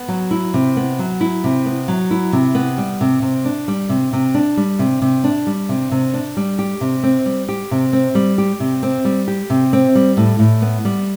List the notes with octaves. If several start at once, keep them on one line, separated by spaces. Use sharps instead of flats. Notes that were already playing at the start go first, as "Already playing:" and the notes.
Already playing: B3
F#3
E4
C3
B3
F#3
E4
C3
B3
F#3
E4
C3
B3
G3
C3
C3
D4
G3
C3
C3
D4
G3
C3
C3
D4
G3
C3
C3
D4
G3
G4
C3
C4
G3
G4
C3
C4
G3
G4
C3
C4
G3
G4
C3
C4
G3
A2
A2
B3
G3